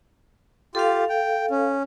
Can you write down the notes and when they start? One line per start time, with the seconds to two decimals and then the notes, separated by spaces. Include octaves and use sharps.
0.75 F4 G4 A4 F5
1.09 G5
1.50 C#4